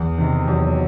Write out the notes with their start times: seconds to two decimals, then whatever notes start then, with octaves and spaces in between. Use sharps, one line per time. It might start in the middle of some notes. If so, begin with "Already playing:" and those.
Already playing: E2
0.18 C3 D#3
0.48 E2 F#3